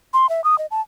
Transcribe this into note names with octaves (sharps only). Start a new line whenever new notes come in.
C6
E5
D#6
D#5
A5